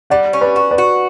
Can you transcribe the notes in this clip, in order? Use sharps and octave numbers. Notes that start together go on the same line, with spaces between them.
G3 D5 F#5
C#4
B4 D5
F#4
B4 D5
F#4